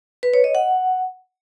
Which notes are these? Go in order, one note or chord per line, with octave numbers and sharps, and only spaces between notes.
B4
C#5
D#5
F#5